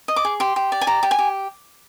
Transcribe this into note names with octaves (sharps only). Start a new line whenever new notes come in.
D#5
D6
G#4
G4 C6
G4
D5
G#5
G4 A#5
G4
G#5
G4